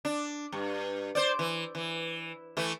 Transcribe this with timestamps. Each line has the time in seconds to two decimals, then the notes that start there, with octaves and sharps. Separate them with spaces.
0.05 D4
0.52 G2
1.15 C5 D5
1.39 E3
1.75 E3
2.57 E3 A3